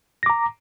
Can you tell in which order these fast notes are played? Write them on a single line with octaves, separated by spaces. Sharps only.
A#6 D6 A#5